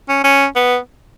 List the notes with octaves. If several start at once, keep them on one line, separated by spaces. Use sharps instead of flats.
C#4
C#4
B3